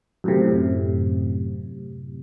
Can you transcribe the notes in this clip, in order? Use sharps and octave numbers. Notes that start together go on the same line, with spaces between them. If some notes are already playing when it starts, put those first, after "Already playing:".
F#2 A2 C3